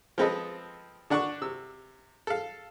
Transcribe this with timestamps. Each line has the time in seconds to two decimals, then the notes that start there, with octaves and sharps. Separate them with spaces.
0.18 F3 G#3 C4 A4 B4 D#5
1.10 D3 D4 F#5 A5 C#6
1.42 C3 E6
2.27 A4 F5